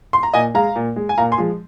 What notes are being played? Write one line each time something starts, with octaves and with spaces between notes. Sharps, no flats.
C6
A#5
A#2 D#5 G#5
G#3 F5 A#5
A#2
G#3
G#5
A#2 F5 A#5
G#5 C6
F3 G#3